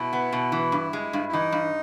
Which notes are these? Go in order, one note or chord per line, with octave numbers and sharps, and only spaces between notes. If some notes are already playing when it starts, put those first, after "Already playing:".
Already playing: B2 E4
B3
B2
E3
G2
G#3
G2
E4
E3 D#4
G2